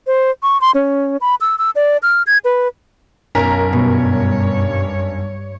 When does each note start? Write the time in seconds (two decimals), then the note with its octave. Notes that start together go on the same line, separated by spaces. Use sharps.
0.07 C5
0.43 C#6
0.61 C6
0.75 C#4
1.21 B5
1.41 E6
1.58 E6
1.76 D5
2.03 F6
2.27 G#6
2.45 B4
3.35 B1 F#2 A#4 G#5 A#5 B6
3.73 G2 B2 C#5